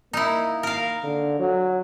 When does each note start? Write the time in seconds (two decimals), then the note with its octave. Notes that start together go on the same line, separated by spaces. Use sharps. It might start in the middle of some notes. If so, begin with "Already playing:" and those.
0.13 A#3 D#4 E4
0.63 A#4 F5
1.03 D3
1.39 F#3